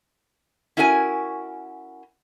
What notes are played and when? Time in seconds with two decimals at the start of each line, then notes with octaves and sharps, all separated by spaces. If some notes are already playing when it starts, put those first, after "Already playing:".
0.77 C#4 E4 F#4 A#4 E5 G#5